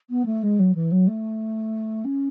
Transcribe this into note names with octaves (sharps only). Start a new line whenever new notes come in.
B3
A3
G#3
F#3
E3
F#3
A3
C#4